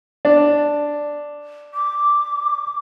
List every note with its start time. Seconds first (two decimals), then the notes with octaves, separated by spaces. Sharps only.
0.25 D4
1.74 D6